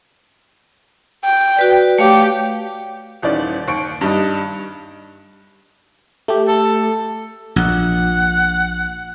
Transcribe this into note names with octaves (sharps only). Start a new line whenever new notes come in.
G5
F#4 B4 D5
A3 G4 C#5 F5
D#1 D#3 E3 C#4 D5
D#2 C#6 D7
G2 G3 D#4
A3 G4
A4
A#1 F#5